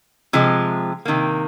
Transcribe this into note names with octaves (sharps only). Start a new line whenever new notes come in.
C3 F3 G#3
C3 D#3 A#3